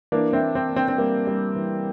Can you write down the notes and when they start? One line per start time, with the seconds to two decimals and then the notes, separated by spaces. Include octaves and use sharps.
0.12 E3 A#3 D4
0.33 C4 E4
0.41 A#3
0.55 C4
0.69 A#3
0.76 C4
0.88 C4
0.98 G3 A#3
1.27 G3
1.55 E3